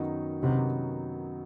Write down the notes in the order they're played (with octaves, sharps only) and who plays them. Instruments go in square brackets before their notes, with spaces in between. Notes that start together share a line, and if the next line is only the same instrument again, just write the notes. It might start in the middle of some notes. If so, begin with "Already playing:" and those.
Already playing: [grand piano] F#2 D#3 F#3 B3 D#4
[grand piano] F#2 D#3 F#3 B3 D#4 [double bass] C3